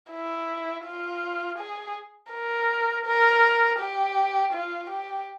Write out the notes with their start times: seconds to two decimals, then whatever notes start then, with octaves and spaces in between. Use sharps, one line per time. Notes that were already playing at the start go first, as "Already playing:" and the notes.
0.11 E4
0.85 F4
1.58 G#4
2.32 A#4
3.06 A#4
3.79 G4
4.53 F4
4.90 G4